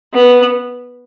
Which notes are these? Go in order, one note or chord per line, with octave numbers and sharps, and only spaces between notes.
B3